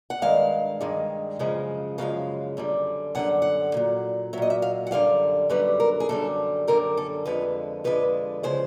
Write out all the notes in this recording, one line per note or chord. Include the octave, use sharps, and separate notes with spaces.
F#5
G2 D#3 G#3 F5
G2 D#3 G#3
F#2 C#3 F3 G#3
F#2 C#3 F3 G#3 F5
F#2 D3 G3
F#2 D3 G3 F#5
F#5
A#2 F#3
A#2 F#3 D#5 E5
E5
F5
F#5
F#2 D3 G3 F5
F#2 D3 G3 B4
A#4
G#4
F#2 D3 G3 A4
F#2 D3 G3 A#4
A4
F2 D3 F3 G#3 B4
F2 D3 F3 G#3 B4
C#3 F3 G#3 C5